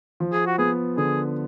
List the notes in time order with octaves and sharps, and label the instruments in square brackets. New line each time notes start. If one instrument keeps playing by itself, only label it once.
[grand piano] F3
[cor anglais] G#4
F#4
[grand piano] B3 [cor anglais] G#4
[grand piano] D3 [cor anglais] G#4